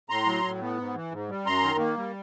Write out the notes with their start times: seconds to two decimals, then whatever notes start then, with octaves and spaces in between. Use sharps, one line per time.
0.09 A2 A#5 C6
0.26 F#3
0.44 A2
0.61 B3
0.78 G#2
0.95 E3
1.12 G#2
1.29 G3
1.45 F#2 A#5 C6
1.62 D#3
1.79 A#3
1.97 G3